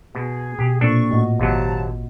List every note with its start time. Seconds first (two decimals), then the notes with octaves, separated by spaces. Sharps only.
0.15 B2 G#4
0.59 B2 G4
0.81 A#2 C4 D4 A4 C#6
1.11 A2 F#4 D#5
1.39 G#1 D#2 C3 F#3 A5 A#5